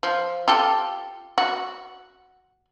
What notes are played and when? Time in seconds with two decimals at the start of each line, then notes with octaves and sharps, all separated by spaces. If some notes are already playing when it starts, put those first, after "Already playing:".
0.03 F3
0.48 F4 G4 A4
1.38 F#4